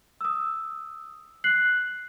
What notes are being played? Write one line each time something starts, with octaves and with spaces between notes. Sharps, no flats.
D#6 E6
F#6 C7 F#7